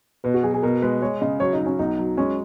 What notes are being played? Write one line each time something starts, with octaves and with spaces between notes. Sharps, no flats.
B2 B4
F#4
F#3 G#4
G#4
B2 A#4
G#3 B4
G#3 C#5
C#3 D#5
F#3 C#5
D#4
F#3
C#4
B1 D#4
F#3
G#3 C#4